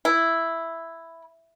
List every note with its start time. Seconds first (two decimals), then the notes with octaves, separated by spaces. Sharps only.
0.05 E4